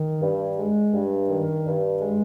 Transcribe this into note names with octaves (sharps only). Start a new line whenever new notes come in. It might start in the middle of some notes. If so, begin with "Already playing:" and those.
Already playing: D#3
G2
G#3
G2
D#3
G2
G#3